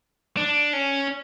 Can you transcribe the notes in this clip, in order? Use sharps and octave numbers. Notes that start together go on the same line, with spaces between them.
D4
C#4